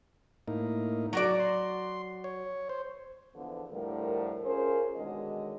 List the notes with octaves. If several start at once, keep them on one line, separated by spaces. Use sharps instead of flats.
A2 A#3 D#4
F#3 F#4 D5
C6
C#5
C5
E2 D3 F3 B3
A2 D3 F3 G3 A#4
C#4 F4 G#4 A#4 C5 C#5
B2 D3 D#3 G#3 C#5 D#5